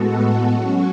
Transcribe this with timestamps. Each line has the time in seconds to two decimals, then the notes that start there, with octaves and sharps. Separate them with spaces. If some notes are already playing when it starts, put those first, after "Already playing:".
Already playing: A2 G#3 B3 F#4 A4
0.50 F#3 C#4 F#4